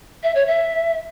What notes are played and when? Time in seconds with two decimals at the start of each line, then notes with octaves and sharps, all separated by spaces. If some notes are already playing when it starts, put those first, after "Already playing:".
0.23 E5
0.35 C#5
0.47 E5